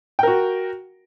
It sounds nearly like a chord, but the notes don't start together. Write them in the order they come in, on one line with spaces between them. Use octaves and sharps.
G5 A#4 F#4